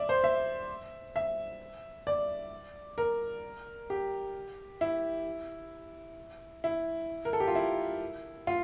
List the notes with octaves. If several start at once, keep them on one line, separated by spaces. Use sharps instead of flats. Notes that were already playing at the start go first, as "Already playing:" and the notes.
Already playing: D5 E5
C5
E5
E5
D5
A#4
G4
E4
E4
A#4
A4
G4
F4
E4
F4